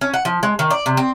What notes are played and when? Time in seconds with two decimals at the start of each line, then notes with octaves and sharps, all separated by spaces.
0.01 C#4
0.14 F#5
0.25 F3
0.43 G#3
0.59 D#3
0.71 D5
0.86 C3
0.97 C4